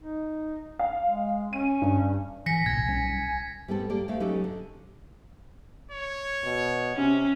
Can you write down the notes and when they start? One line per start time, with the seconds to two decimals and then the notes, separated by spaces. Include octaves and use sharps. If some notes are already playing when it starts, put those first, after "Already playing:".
0.01 D#4
0.79 F5
1.04 G#3
1.53 C#4 D#7
1.82 G2
2.46 A1 E3 G#5 A#6 B6 C#7
2.66 F#1 C2 A#2 G#6
2.88 B1 G3 C#4
3.68 G3 B3 C4 A4
3.90 A#3 G4 D5
4.08 D2 A3 F5
4.20 F#3 C#4 D#4 G4 A4
4.44 D3
5.91 C#5
6.44 B2
6.96 C3 C#4